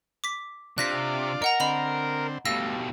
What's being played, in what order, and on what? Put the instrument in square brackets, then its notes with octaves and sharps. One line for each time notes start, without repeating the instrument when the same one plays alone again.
[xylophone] D6 B6
[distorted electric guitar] C3 [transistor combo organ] D4 F4 D5 [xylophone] F#6 A#6 B6
[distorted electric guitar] A#4 [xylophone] D#5 F#5 A#5
[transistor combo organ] D3 C4 [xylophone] D#5 B5 F7
[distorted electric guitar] B2 G3 [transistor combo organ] A3 [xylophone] F5 E6 A#6